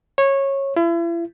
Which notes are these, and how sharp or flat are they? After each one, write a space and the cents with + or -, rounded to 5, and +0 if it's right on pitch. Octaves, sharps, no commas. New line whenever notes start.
C#5 -15
E4 +40